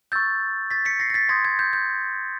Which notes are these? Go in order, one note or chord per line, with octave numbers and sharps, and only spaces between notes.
C#6 E6 G6 A6
A6 B6
B6 C#7
A#6 C7
A#6
A6 B6
C6 D#6 G6 G#6 A#6
G#6
G6
G6